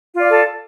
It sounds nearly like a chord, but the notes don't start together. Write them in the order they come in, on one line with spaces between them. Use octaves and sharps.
F4 D5 F5 A4